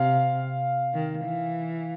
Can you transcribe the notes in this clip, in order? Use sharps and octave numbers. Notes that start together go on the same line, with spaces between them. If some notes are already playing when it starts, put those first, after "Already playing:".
Already playing: C3 F5
D#3
E3